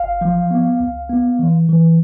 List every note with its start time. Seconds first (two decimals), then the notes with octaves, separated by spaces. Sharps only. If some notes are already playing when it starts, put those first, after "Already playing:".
Already playing: G1 F5
0.21 F3
0.51 B3
0.80 C#2
1.10 B3
1.39 E3
1.69 E3